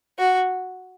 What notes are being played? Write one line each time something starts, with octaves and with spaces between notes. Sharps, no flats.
F#4